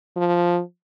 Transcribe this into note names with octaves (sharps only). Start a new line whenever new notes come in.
F3